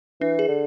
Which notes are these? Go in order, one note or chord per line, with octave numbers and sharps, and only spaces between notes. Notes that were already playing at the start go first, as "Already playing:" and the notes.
E3 D4
G#4
D3